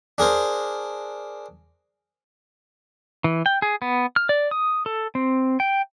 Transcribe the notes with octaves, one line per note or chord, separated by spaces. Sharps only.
D4 G#4 A#4 C5
E3
G5
G#4
B3
F6
D5
D#6
A4
C4
G5